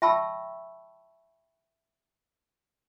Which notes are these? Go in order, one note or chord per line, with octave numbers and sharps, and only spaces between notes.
E5 G5 A5 B5 C#6 E6